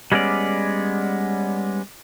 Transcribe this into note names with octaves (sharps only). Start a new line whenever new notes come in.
G3 G#3 B3 C#4 D5